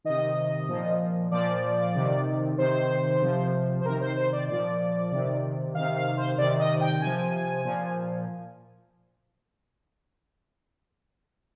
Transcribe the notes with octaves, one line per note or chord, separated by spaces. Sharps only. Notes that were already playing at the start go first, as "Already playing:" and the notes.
C3 D#3 D#5
A#2 F3
A#2 F3 D5
C3 D#3
C3 D#3 C5
C3 F3
C5
C3 D#3 A#4
C5
C5
D5
A#2 F3 D5
C3 D#3
C3 D#3 F5
F5
C5
C3 D#3 D5
D#5
G5
C3 F3 G#5
A#2 F3